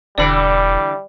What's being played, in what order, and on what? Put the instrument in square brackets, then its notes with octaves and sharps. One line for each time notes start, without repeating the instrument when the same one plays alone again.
[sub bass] E1 [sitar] D3 E3 [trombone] G3 [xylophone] D5 B5 D7